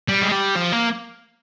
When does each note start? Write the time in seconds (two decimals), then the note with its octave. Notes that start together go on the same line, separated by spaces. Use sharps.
0.09 G3
0.22 G#3
0.32 G3
0.56 F3
0.73 A#3